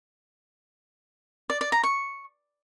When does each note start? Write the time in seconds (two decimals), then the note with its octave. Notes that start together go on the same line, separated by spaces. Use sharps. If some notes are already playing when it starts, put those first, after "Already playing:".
1.50 D5
1.61 D5
1.72 A#5
1.84 C#6